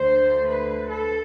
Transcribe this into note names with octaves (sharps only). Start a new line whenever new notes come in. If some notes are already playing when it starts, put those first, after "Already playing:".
Already playing: D2 D3 A3 C5
B4
A4